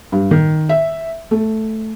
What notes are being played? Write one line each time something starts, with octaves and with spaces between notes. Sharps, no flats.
G2
D#3
E5
A3